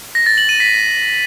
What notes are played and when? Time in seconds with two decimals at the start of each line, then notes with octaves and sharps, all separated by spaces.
0.15 A#6
0.26 A6
0.38 F#7
0.49 D#7
0.60 B6